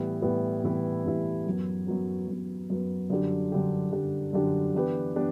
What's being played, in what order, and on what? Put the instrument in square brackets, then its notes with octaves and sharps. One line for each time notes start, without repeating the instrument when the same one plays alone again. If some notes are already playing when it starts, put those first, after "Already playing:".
Already playing: [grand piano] A2 E3 G3 B3 E4
A2 E3 G3 B3 E4
A2 E3 G3 B3 E4
A2 E3 G3 B3 E4
F#2 F#3 B3
F#2 F#3 B3
F#2 F#3 B3
F#2 F#3 B3
F#2 D3 G3 D4 G4
F#2 D3 G3 D4 G4
F#2 D3 G3 D4 G4
F#2 D3 G3 D4 G4
E3 B3 D4 G4 B4
E3 B3 D4 G4 B4